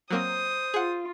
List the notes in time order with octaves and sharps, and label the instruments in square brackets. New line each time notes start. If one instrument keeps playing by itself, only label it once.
[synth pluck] F#3 A#3 C4 [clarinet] C5 [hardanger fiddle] D#6
[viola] F4 [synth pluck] G#4 F#5